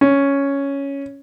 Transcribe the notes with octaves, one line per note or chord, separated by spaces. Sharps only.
C#4